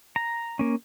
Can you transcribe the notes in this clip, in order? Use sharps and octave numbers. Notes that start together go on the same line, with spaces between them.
A#5
A#3 C#4